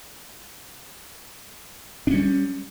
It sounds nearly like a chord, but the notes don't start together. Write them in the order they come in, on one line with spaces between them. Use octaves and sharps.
D4 C#4 G3